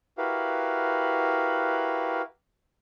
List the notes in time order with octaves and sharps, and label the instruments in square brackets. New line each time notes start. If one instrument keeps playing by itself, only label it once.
[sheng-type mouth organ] E4 F#4 G4 A#4 B4 F5